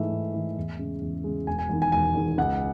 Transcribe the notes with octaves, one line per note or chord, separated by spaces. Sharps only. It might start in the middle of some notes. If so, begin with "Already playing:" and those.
Already playing: G#2 E3 A3 E5
G#2
E3 A3
E2
C#3 G#3
E2
C#3 G#3
E1 G#5
G#5
E2 D#3
G#5
E1 G#5
E2 D#3
C#2 F#5